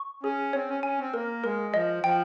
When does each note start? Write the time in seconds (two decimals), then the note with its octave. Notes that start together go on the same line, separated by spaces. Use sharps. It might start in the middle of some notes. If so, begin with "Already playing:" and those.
Already playing: C#6
0.23 C#4 G#4
0.53 C4 C#5
0.69 C#4
0.83 C#4 G#5
0.98 C4
1.13 A#3 A#4
1.44 G#3 A#4
1.74 F3 D#5
2.03 F3 G5